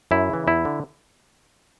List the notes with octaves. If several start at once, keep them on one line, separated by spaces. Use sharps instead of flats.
F#2 E4
C#3 E3
E2 E4
D3